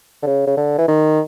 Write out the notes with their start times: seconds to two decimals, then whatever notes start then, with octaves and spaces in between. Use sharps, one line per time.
0.23 D3
0.27 C#3
0.47 C#3
0.57 D3
0.78 E3
0.88 D#3